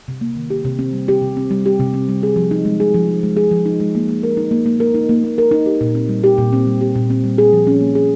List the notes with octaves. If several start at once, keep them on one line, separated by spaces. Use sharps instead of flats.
C3
A#3
D#3
G4
C3
C4
G3
G4
C3
C4
G3
G4
C3
C4
G3
G#4
F3
D#4
G#3
G#4
F3
D#4
G#3
G#4
F3
D#4
G#3
A#3
A#3
A#4
D#4
A#3
A#3
A#4
D#4
A#3
A#3
A#4
D#4
G4
A#2
C4
G3
G4
A#2
C4
G3
G4
A#2
C4
G3
G#4
F3
C#4
A#3
G#4